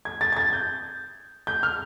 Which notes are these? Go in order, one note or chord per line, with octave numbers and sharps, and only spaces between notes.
G#6
A6
G#6
A6
G6
G6
F6